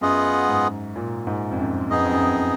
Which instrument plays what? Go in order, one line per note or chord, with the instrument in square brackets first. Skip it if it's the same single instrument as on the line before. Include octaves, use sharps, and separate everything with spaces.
[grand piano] F#2 [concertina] B3 F4 G#4 D#5 F#5
[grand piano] G#2
A#2
G#2
F2
F#2
[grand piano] F2 [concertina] B3 D#4 G#4 D#5
[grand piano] F#2
F2
F#2
F2